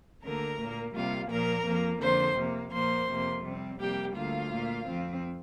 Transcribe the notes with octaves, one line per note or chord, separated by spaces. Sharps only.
D2 D3 A#3 A#4 A#5
A#2 A#3
C3 G3 A#3 F4 F5
A#2 F3 A#3 A#4 A#5
F2 F3 A#3
F2 D3 A#3 C5 C6
C3 A#3
A#2 F3 A#3 C5 C6
F2 C3 A#3
C3 G3 C4
F2 C3 G3 A#3 G4 G5
D2 D3 A#3 F4 F5
A#2 A#3
F2 F3 C4